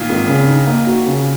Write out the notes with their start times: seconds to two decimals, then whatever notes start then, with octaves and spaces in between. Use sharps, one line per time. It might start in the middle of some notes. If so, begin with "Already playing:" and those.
Already playing: A#2 D#3
0.10 G#1
0.28 C#3
0.48 D#4
0.67 A#3
0.87 F#4
1.07 C#3